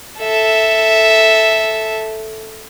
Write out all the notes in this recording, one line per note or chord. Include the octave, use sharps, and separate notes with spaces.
A4 E5